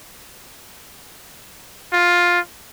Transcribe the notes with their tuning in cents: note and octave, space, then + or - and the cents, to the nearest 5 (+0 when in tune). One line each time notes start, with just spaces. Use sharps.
F4 +10